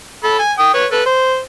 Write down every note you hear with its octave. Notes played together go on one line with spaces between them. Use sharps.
A4 B5
G#5
G5 D#6
B4 C#5
A4 B4
C5